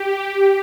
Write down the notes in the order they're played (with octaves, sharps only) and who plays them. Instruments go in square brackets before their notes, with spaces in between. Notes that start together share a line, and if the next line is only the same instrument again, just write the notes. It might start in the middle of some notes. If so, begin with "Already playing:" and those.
Already playing: [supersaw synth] G4